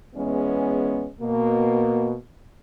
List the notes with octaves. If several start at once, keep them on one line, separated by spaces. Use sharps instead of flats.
E2 G#3 B3 C#4
B2 A#3